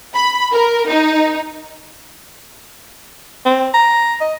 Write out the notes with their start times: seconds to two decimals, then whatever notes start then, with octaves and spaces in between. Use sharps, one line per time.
0.15 B5
0.52 A#4
0.88 D#4
3.45 C4
3.74 A#5
4.21 D#5